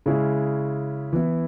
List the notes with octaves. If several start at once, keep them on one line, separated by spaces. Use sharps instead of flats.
C#3 G#3 C#4 E4
E3 B3 E4